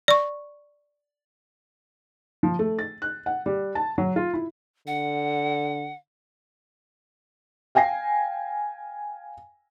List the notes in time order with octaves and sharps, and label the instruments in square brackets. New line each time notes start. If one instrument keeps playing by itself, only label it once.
[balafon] D5 C#6
[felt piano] F3
A3
A6
F#6
F#5
G3
A5
F#3
F4
E4
[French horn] D3 [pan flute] F#5
[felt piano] F5 G5 G#5 A#6 C7